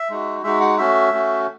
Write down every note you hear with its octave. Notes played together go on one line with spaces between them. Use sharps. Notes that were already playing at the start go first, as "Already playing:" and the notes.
Already playing: E5
G#3 D#4 F#4
G#3 D#4 F#4 E5
F#5
A3 C#4 F#4 E5
A3 C#4 F#4